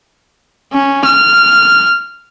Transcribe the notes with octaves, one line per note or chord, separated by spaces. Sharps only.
C#4
F6